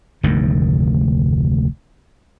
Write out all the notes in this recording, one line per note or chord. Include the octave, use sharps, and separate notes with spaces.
F1 D2 G#2 D#3